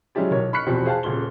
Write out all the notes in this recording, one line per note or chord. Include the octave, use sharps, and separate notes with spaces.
F#3 G#3 C#4 E4 G4 D5
B1 A#4 C#5
B5 C#6 F6 F#6 B6 C#7
E2 B2 F3 C4 F#4 G4
G#4 C5 F5 G5 A5 F#6
D#1 C#3 C6 G7